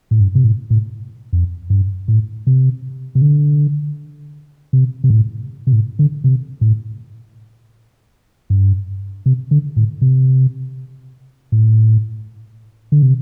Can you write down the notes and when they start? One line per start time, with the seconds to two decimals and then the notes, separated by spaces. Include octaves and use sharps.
0.11 A2
0.20 G2
0.35 C3
0.44 A2
0.70 A2
1.33 F2
1.70 G2
2.08 A2
2.47 C3
3.15 C3
3.22 D3
4.73 C3
5.04 C3
5.10 A2
5.67 C3
5.73 A2
5.99 D3
6.24 C3
6.61 A2
8.50 G2
9.26 C3
9.51 D3
9.77 A2
10.01 C3
11.52 A2
12.92 D3
13.02 C3